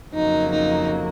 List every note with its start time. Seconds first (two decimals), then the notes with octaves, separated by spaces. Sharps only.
0.13 F2 C#3 F#3 A#3 D#4
0.51 D#4